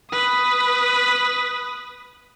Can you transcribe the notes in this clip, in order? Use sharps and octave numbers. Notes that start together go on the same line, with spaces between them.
B4 D#6